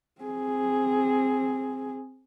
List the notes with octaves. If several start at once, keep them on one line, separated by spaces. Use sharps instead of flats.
C4 G#4